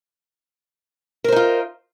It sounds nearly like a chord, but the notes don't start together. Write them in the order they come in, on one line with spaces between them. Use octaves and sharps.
A#4 C5 D#4 F4